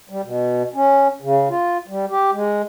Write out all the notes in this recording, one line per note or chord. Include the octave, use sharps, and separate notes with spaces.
G3
B2
C#4
C#3
F4
G3
G4
G#3